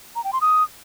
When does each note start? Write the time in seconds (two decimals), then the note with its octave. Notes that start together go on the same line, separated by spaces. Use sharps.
0.16 A#5
0.24 G5
0.33 C6
0.41 D#6